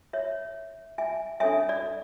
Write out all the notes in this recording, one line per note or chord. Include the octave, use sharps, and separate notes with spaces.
C#5 E5
E5 G#5
D4 A4 C#5 E5 G#5
D5